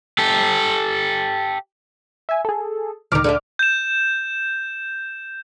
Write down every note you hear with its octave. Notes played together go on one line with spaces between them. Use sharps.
G4 A4
E5 G#5
G#4 A4
D2 D#3 F3 D6 F6
D3 A4 E5
G6 E7